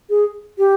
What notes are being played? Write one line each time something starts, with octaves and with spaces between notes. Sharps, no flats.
G#4
G4